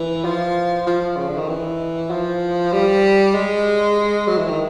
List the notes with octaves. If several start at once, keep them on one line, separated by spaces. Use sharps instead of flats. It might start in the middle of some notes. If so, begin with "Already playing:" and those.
Already playing: E3
F3
F3
C#3
D3
D#3
E3
F3
G3
G#3
F#3
E3
D#3